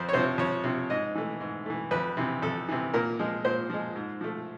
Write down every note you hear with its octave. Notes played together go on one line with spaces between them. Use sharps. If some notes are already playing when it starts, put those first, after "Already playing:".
Already playing: F2 C5
C#5
C3 F3 C5
F2 C#5
C3 F3
G#2 D#5
E3 A3
G#2
E3 A3
F2 B4
C3 E3
F2 A4
C3 E3
A#2 A#4
F3 G#3
A#2 C5
F3 G#3
G#2
F3 A3